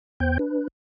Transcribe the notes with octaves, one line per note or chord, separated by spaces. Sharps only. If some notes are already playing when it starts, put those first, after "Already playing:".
E2 B3 C5 G5 G6
D4 B4